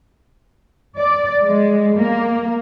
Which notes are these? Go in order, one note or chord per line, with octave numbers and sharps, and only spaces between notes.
D5
G#3
A#3